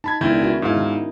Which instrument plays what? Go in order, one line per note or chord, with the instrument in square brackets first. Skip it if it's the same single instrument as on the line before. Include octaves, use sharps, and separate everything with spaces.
[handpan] D#4 [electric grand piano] A5 B5 G#6
[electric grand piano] C#2 E4 G6 [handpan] D#3 B3 D4
[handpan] C#4 F#4 E5
[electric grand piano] G#2 F5 [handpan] D#4 E4
[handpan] D#3